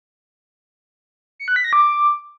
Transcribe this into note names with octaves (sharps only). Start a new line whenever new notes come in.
C#7
F#6
B6
A#6
D6